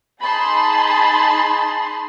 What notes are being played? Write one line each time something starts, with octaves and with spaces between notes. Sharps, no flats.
D#4 G#4 A5 B5 C6